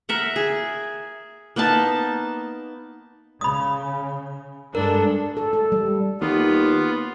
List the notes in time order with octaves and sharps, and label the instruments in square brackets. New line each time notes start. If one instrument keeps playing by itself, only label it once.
[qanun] A#4 E5 F#5
G#4
A#3 B3 D#4 A5
[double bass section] C#3 [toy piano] B5 D#6
[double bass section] G2 G#3 [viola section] D4 A4 [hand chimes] A#4
[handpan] A4
A4
G3
[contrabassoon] D#2 [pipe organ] B3 F4